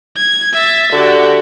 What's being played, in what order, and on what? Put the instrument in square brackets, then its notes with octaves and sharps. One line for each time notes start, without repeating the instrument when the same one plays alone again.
[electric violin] G#6
E5 A6
[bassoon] D3 [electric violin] F#4 G4